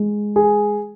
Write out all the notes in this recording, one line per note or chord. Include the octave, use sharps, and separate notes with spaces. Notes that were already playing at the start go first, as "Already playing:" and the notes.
Already playing: G#3
G#4